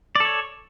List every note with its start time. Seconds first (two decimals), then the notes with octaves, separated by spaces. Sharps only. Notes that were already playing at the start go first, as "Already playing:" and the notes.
0.15 D5
0.20 A4
0.25 C#5